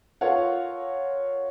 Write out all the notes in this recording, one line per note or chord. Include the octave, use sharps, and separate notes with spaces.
F4 A4 A#4 C#5 F5 F#5